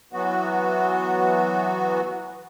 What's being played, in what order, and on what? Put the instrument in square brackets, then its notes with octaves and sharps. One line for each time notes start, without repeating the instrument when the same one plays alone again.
[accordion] E3 F#3 B3 F#4